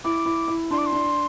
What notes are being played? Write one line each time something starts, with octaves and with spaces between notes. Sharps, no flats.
E4 D6
E4
E4
D4 C6
D6
C6
D4